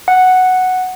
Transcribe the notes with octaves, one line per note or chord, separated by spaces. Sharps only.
F#5